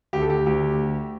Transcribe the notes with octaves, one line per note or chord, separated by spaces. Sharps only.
D2 G4
A4
G4
D2 G4